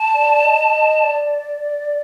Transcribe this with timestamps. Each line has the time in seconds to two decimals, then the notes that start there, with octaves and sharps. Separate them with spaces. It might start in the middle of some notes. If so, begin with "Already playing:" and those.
Already playing: A5
0.15 D5
0.44 D#5
0.74 D#5
1.03 D5